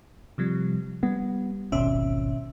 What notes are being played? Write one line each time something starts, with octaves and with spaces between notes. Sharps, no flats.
C3 F3 G3
G3 B3
D#1 G#1 B2 C#4 E5